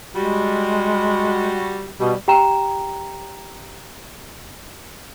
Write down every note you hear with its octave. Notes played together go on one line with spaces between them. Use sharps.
G3 G#3 F#4
B2 G3
G4 G5 A#5 E7